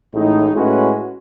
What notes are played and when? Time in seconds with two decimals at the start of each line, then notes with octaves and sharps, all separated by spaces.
0.13 A1 A2 G#3 D#4
0.52 A2 G#3 C#4 F#4 B4